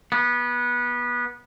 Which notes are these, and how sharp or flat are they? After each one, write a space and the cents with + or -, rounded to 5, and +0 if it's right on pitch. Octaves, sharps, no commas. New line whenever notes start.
B3 -20